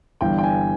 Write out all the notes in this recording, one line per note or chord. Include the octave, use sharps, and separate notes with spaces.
G1 G2 E3 G5
G5
G#5